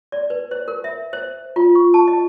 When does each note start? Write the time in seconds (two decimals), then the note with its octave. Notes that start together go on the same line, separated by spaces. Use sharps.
0.12 D5
0.30 B4
0.51 C5
0.68 A#4
0.84 E5
1.13 C5
1.56 F4
1.75 C#6
1.94 A5
2.08 D#5